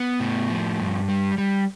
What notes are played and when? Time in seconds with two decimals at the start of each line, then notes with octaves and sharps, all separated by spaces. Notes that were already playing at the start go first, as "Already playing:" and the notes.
Already playing: B3
0.20 A2
0.49 F3
0.80 G2
1.09 G3
1.38 G3